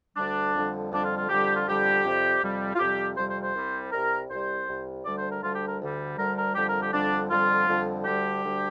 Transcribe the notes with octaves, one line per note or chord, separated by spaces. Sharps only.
D2 D3 G3 D4
F2 D3 G3
F2 D3 G3 D4
F4
F4
F2 D3 G3 G4
F4
F2 D3 G3 G4
F2 C3 G3
F2 C3 G3
F4
F2 C3 G3 G4
F2 C3 G3 C5
C5
C5
C2 C3 G3
C2 C3 G3 A#4
C2 C3 G3 C5
C2 C3 G3
D2 D3 G3 D5
C5
A#4
D2 D3 G3 F4
G4
A#4
D2 D3 G3
D2 D3 G3 A#4
A#4
F2 D3 G3 G4
A#4
G4
F2 D3 G3 D4
F2 D3 G3 F4
F2 D3 G3
D2 D3 G3 G4
D2 D3 G3